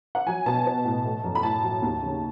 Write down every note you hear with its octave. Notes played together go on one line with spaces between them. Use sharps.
F#5
F#3 G#5
B2 A5
B3
A2
A3
F#2
B5
A2 A5
F#3
D#2
C#3